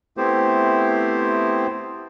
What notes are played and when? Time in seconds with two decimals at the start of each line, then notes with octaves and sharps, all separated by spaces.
0.17 A3 B3 C4 E4 G4 C5